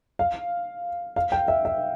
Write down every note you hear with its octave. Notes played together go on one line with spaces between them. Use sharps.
F5
F5
G5
E5
E5